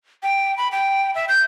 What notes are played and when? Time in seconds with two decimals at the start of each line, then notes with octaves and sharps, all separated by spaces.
0.23 G5
0.57 B5
0.72 G5
1.15 E5
1.29 G6